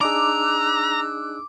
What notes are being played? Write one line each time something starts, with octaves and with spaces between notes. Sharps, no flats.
D4 D#4 G#4 A#5 D6 E6 F#6